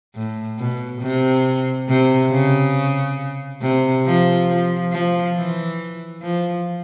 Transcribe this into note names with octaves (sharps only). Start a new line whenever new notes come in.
A2
B2
C3
C3
C#3
C3
F3
F3
F3
E3
F3